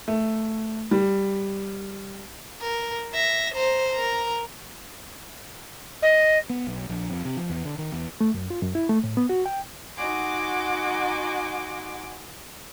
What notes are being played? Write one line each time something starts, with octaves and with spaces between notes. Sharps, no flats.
A3
G3
A#4
E5 A#6
C5 A#5
A#4 A#5
D#5
B3
B1
A#1
F2
C3
F3
E2
D3
D#3
E2
A3
F#2
F4
F#2
E4
A3
A2
B3
F#4
G5
D#4 F#4 F#5 G#5 C6 D6